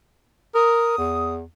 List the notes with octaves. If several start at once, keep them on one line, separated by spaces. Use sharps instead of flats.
A#4 D#6
E2